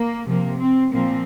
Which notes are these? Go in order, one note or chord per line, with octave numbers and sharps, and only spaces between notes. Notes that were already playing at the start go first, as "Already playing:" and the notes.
Already playing: A#3
C3 F3 A#3
C4
A#2 F3 A#3 C4